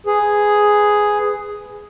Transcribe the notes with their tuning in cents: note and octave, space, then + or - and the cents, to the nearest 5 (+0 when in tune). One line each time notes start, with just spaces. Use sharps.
G#4 +0 B4 +20